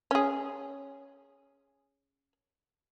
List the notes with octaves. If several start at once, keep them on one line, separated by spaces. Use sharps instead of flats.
C#4 G#4